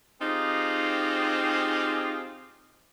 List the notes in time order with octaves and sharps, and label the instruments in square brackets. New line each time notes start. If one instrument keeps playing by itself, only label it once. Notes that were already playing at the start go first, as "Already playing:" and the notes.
[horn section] C4 D#4 F4 G4 G#4